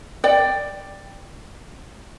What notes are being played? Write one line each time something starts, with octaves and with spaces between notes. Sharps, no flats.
D5 G5